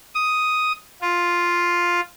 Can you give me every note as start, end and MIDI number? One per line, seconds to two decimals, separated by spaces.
0.15 0.72 87
1.02 2.00 65